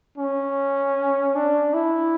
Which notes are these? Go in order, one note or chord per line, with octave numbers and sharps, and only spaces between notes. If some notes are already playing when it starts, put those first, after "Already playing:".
C#4
D4
E4